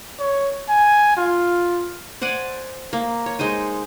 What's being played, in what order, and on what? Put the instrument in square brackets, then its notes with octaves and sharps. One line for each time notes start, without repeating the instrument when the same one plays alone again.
[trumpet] C#5
G#5
F4
[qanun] C5 D5 F#5 G#5
A#3
C#5
G#3 D#4 C5 G#5